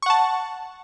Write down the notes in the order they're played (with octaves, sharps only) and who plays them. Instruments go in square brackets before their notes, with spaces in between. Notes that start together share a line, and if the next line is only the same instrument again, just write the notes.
[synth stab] C#6
F#5
A5